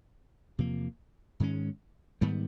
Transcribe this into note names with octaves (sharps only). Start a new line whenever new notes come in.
E2 C3 F3 A#3
G#2 D#3 G#3 C#4
G#2 D#3 G3 B3